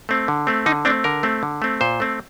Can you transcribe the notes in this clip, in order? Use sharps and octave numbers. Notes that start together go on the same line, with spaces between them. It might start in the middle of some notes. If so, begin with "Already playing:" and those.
A3 C4
D3
A3 C4
D3 D#4
A3 C4 D4
D3 A#4
A3 C4
D3
A3 C4
A#2 C5
A3 C4